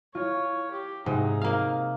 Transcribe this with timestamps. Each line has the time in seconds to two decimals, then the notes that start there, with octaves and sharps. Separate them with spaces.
0.15 F4 C#5
0.71 G4
1.06 G#2 C3 D#4 G#4
1.41 A#3 F5